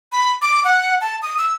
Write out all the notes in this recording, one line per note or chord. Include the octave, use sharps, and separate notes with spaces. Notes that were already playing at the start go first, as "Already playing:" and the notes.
B5
D6
F#5
A5
D#6
E6